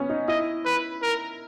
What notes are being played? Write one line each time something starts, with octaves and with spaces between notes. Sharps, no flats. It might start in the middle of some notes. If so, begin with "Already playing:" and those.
Already playing: B3 C#4
D#4
E4 D#5
B4
A#4